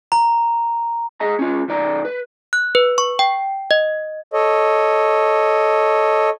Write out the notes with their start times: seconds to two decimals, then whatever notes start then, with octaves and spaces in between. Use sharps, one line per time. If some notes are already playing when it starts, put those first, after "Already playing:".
0.12 A#5
1.20 G#4 D#5 A#5
1.39 C#4 F4
1.68 B1 D#3 D5 A#5
2.05 B4
2.53 F#6
2.75 B4
2.98 C#6
3.19 G5
3.71 D#5
4.33 A4 C#5 D#5